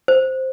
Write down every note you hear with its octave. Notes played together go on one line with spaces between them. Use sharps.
C5